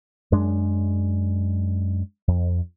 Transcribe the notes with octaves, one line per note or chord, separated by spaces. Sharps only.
F#2 G#3 D4
F2